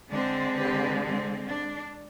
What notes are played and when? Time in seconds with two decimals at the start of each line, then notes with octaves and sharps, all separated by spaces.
0.10 D3 G#3 C4 D4
0.57 G4 B4
1.03 C4
1.49 D4